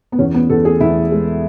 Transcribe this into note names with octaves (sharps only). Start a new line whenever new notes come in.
B3
E2 C#4
B3
E2 A4
G#4
E2 E4
G#3